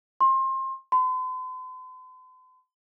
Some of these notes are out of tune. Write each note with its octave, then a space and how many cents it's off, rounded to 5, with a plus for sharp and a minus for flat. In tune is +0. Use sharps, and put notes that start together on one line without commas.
C6 +25
C6 -45